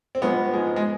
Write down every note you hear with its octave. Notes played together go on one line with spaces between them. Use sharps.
C4
G2 F3 G#3 B3
G#2 F3 G#3
G#3